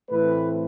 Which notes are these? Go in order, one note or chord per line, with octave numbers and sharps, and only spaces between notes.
A2 E3 A3 C4 B4